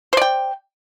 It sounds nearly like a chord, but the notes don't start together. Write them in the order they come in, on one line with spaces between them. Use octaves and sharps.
C5 D5 G5